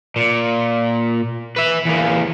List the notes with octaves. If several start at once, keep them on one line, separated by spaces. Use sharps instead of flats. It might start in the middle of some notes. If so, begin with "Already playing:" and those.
A#2
B4 E5
E2 A#3